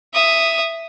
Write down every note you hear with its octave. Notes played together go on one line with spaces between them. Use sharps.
E5 D#6